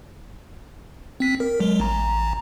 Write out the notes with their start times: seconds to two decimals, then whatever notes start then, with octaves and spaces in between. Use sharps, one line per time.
1.20 C4 B6
1.40 A#4
1.60 F#3 G#3
1.80 A1 A#5